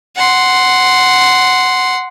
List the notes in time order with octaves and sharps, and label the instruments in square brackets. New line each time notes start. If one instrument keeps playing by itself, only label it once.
[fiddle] F#5 C6